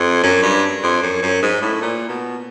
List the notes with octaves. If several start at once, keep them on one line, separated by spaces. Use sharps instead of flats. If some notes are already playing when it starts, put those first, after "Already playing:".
Already playing: F2
F#2
G2
F2
F#2
F#2
G#2
A2
A#2
B2